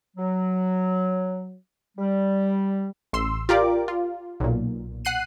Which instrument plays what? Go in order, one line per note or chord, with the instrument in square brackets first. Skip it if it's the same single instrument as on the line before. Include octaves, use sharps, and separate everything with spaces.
[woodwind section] F#3
G3
[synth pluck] A1 C6 E6
F4 G4 A#4 D5 D6
F4
B1 A#2
F#5 F#6 C7 D#7